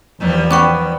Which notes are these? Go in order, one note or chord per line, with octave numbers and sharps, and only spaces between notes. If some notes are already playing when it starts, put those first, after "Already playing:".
E2 D#3 F3 G3
B3 G5 C#6 D6